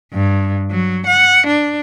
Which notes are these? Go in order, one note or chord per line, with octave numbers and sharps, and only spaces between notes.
G2
F#3
F#5
D4